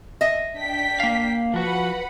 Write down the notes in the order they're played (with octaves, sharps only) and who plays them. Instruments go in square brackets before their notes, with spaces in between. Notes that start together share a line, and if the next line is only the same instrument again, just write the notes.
[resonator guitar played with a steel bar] D#5 E5
[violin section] D4 G5 B6
[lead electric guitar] A#3 F5
[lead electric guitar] F3 F#4 [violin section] B4 F#5 B5